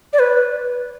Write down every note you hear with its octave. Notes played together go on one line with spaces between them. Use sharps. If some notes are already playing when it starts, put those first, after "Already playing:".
D5
B4